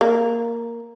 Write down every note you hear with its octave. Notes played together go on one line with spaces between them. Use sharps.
A#3